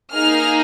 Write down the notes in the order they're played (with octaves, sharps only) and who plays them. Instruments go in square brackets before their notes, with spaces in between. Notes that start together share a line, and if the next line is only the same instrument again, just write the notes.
[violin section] A#3 D#4 G#4 F6